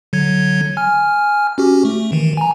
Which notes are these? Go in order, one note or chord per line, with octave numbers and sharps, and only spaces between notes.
D3 F#3 G#6
G#5 F6
C#4 F#4 G4
A3
D#3 E3
G#5 A#5